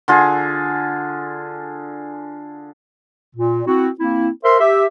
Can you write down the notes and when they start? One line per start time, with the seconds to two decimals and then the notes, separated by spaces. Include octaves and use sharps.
0.08 D3 F4 G#4
3.35 A#2
3.67 C4 E4 F#4
4.00 A#3 C4 E4
4.44 A#4 C5 E5 C6
4.60 G4 E5